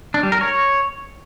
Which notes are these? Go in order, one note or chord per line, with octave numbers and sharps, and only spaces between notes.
D4
G3
A#4
C#5